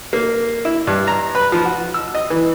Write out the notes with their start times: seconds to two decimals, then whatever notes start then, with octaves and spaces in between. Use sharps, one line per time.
0.13 A#3
0.65 E4
0.87 G2
1.08 A#5
1.35 B4
1.52 F3
1.65 F#4
1.94 E6
2.15 D#5
2.30 E3